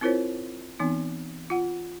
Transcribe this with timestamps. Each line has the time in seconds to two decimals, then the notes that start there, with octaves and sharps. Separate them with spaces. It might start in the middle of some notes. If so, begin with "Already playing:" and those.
0.01 C4 E4 F4 A#4 C5 C#5
0.80 E3 B3 C4 D#4
1.50 F4 F#5